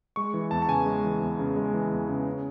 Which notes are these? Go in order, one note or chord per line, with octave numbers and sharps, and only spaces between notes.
G#3 C#6
E3
E2 A5
A5
C#3 G#5
G#3
E3
E2
C#3
G#3
E3
E2
C#3
C#4